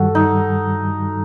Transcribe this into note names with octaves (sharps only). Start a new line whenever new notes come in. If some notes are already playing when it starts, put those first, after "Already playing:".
Already playing: G2 D#3 G3 F#4 A4
D#4